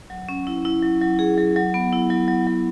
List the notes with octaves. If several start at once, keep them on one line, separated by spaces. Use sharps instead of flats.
F#3
C#4
E4
E4
F#3
F#3
G#4
F#3
F#3
B3
E4
F#3
F#3
F#3